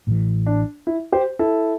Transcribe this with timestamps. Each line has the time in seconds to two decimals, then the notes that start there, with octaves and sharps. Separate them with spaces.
0.07 A1 A2 E3
0.46 D4
0.87 E4
1.12 G4 C5
1.39 E4 A4